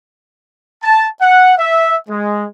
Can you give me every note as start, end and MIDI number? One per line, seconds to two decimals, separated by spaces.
0.83 1.07 81
1.21 1.54 78
1.58 1.95 76
2.09 2.45 56